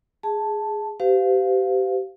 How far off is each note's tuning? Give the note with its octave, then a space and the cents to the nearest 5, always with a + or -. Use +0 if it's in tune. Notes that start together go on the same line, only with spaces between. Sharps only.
G#4 +0 A5 +0
G4 -25 C5 -40 F5 +0